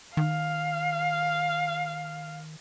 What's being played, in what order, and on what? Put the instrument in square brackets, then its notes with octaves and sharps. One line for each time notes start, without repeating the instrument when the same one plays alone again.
[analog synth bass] D#3 [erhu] F5